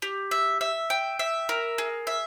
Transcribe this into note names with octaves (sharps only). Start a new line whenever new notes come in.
G4
E5
E5
G5
E5
A#4
G#4
E5